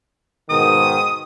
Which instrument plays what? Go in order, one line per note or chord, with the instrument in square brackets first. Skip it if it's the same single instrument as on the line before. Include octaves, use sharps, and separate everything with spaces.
[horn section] G#2 B2 D#3 [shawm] D#6